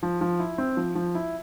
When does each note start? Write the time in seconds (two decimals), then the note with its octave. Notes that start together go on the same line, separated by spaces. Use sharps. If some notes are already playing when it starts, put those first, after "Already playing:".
0.03 F3
0.21 F3
0.40 E4
0.58 C4
0.77 F3
0.95 F3
1.15 E4